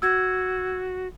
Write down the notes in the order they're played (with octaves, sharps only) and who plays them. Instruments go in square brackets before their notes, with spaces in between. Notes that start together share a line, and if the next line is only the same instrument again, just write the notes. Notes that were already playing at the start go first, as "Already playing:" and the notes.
[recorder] F#4 [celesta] E6 G#6